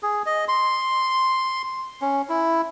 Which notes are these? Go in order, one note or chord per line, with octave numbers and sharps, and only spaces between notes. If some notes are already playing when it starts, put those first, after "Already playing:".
G#4
D#5
C6
C#4
E4